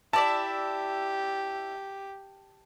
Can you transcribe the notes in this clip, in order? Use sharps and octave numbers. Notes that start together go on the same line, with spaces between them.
E4 G4 D5 E5 A5